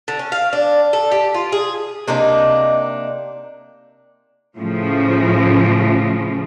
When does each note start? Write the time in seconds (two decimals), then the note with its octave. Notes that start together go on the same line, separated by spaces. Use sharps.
0.08 D3
0.19 C#4
0.32 F5
0.53 D4
0.93 A4
1.11 G4
1.34 F4
1.52 G#4
2.08 C3 A#3 D4 D#4
4.56 A2 C#3 F3